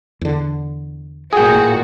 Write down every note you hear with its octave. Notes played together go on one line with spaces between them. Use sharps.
E2 D3
A1 A#2 F#4 G#4 G5